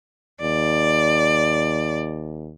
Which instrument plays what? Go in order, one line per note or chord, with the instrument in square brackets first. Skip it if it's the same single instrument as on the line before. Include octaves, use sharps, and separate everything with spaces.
[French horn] D#2 [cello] D5